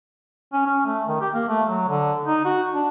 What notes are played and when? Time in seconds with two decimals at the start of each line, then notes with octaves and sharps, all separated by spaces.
0.53 C#4
0.66 C#4
0.85 A3
1.07 D#3
1.21 G4
1.34 A#3
1.49 A3
1.69 F#3
1.89 D3
2.25 D#4
2.45 F#4
2.73 D4